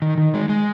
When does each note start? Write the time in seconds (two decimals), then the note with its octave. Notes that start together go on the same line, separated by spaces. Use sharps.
0.02 D#3
0.18 D#3
0.34 G#3
0.49 G#3